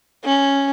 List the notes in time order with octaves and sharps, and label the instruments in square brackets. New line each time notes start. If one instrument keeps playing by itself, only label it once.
[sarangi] C#4